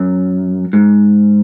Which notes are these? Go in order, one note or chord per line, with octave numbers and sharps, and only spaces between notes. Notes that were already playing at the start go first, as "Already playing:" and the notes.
Already playing: F#2
G#2